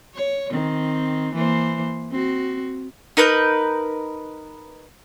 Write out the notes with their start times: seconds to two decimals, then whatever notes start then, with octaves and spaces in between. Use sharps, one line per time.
0.15 C#5
0.51 D#3 C4
1.34 E3 A#3 C5
2.11 C4 F#4
3.17 D#4 A#4 B4 G6